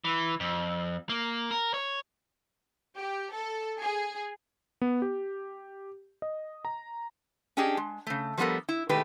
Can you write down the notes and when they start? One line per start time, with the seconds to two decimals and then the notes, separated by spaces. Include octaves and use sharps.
0.04 E3
0.40 F2
1.09 A#3
1.51 A#4
1.74 C#5
2.97 G4
3.34 A4
3.81 G#4
4.82 B3
5.02 G4
6.22 D#5
6.65 A#5
7.57 C#4 D4 G4 G#4 D#5
7.77 G#3
8.07 C#3 A3
8.38 F3 G3 A3 B3 A4 A#4
8.69 E4
8.89 B2 D#3 G#3 A3 G4 B4